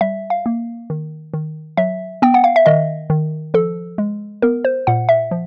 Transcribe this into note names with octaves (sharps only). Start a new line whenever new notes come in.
G3 E5
F5
A#3
D#3
D#3
F#3 E5
B3 G5
F#5
F5
E5
D#3 D#5
D#3
F3 A4
G#3
B3 A#4
C5
A#2 F#5
E5
F3